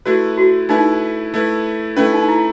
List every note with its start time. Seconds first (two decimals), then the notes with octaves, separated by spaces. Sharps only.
0.06 A3 E4 F#4 B4
0.37 F#4
0.69 A3 D#4 E4 B4
1.34 A3 E4 B4
1.97 A3 C#4 E4 B4
2.13 D#4
2.28 E4